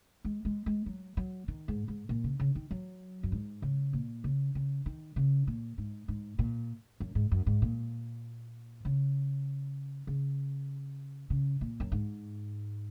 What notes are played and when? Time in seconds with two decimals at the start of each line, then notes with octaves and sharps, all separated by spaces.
0.25 G#3
0.45 G#3
0.66 G#3
0.86 F#3
1.17 F#3
1.48 D#3
1.68 G#2
1.88 G#2
2.09 A#2
2.24 C#3
2.40 C#3
2.55 D#3
2.71 F#3
3.23 F#2
3.32 G#2
3.62 C#3
3.93 A#2
4.24 C#3
4.55 C#3
4.86 D#3
5.16 C#3
5.47 A#2
5.78 G#2
6.08 G#2
6.39 A#2
7.00 F#2
7.15 G#2
7.32 F#2
7.46 G#2
7.62 A#2
8.85 C#3
10.07 C#3
11.30 C#3
11.61 A#2
11.80 F#2
11.92 G#2